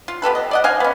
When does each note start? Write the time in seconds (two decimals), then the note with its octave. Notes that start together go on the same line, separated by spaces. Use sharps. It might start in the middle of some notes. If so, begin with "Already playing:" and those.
0.08 F4
0.22 B3 G4 A4 B4
0.35 D#5
0.51 D5 D#5 F#5
0.64 D#5 F5 G#5
0.80 B3 C#4